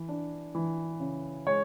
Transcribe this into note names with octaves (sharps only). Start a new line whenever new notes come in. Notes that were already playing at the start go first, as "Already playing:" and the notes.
Already playing: E3
D4
E3
C#3
G#3 C#5